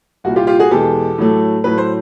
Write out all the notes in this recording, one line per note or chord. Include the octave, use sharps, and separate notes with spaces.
C2 A#2 G3 F#4
F4 G4
F4 G4
F#4 G#4
E2 B2 G#3 G4 A4
A2 F#3 A3
A2 F#3 A3 B4
C5